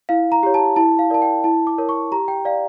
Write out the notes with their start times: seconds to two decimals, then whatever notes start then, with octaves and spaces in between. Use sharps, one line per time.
0.09 E4 F5
0.32 A#5
0.43 G4 C#5
0.54 A5
0.76 E4 A5
0.99 F5
1.10 A#4 D5 A5
1.22 G5
1.44 E4 A5
1.67 D6
1.78 A#4 C#5
1.89 C#6
2.12 G4 A#5
2.28 G5
2.45 D5 F5